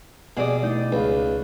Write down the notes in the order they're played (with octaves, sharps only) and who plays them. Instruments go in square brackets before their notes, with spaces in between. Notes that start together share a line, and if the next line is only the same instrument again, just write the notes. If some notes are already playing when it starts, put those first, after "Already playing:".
[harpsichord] B2 [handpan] G4 [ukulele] G#4 D5 D#5
[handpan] A3 E4 D5 [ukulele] D#4
[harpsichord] C#2 [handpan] B4 F5